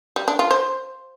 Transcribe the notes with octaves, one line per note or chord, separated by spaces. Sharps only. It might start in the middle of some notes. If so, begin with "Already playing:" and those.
G3
D4
F4
C5